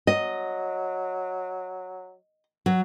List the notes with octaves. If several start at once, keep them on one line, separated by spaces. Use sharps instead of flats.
F#3 D#5
F#3